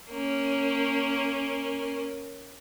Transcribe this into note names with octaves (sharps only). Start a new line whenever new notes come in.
A#3 C#4